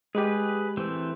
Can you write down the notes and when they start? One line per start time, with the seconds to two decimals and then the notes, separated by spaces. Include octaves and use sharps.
0.15 G#3 G4 G#4 B4
0.77 E3 A3 C4